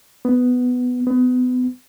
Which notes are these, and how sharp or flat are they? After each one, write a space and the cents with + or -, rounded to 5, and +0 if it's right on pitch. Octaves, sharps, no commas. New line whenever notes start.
B3 +10
B3 +30